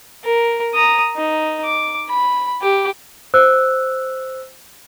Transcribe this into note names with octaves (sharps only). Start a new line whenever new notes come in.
A#4
A#5 D#6
D#4
D6
B5
G4
C5 E6 F#6